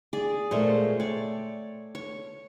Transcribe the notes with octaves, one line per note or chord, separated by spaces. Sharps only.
G#4 D5
A#2 G#3 A3 F4 C5 C#5
C#5 D5 G5
C#5